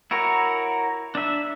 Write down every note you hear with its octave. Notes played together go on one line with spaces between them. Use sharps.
E4 F#4 A#4 C#5
D4 E5